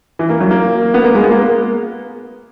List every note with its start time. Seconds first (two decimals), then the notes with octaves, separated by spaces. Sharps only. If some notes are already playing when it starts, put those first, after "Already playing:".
0.19 E3
0.30 A#3
0.41 F#3
0.51 A#3
0.94 B3
1.04 A#3
1.15 G#3
1.23 B3
1.31 A#3